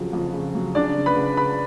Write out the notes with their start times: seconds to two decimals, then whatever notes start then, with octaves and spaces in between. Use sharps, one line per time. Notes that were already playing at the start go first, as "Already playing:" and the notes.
Already playing: F2 C#3 F#3 F#4
0.13 F2
0.34 C#3
0.55 F#3
0.75 C#3 D4 D5
0.97 C#3
1.06 B4 B5
1.17 C#3
1.37 C#3 B4 B5